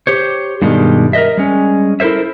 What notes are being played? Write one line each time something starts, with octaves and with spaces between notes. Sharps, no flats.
G4 C5 C#5
G2 B2 D#3 G3 G#3
A#4 B4 D#5 E5
G3 G#3 C#4
E4 A4 A#4 C5 E5